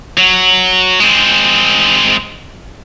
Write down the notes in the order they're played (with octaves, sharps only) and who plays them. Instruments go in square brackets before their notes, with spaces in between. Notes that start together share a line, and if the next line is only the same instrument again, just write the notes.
[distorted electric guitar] F#3
G#3 C4